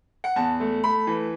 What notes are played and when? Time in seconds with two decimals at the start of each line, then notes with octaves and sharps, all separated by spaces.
0.24 F#5
0.36 E2 A5
0.60 A3
0.84 A3 B5
1.07 E3